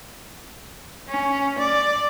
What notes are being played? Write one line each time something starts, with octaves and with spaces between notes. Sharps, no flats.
C#4
D5